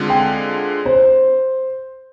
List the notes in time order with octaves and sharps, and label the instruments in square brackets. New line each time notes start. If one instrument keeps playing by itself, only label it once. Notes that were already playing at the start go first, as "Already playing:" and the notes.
Already playing: [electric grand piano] D3 G#3 C4 F4
[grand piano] G5
C5